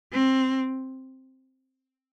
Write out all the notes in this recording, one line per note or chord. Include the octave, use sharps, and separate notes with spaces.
C4